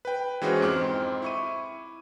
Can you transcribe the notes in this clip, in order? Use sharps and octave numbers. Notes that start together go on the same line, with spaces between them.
B4 G5
E3 G#3 C#4 F#4 G#4 C5
F2 G#2 C4 D6 F6
E4 C#6 D#7